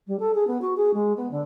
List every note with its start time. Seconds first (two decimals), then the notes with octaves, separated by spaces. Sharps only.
0.07 G3
0.19 A4
0.34 G#4
0.47 B3
0.61 F#4
0.77 G#4
0.93 G#3
1.17 B3
1.31 D3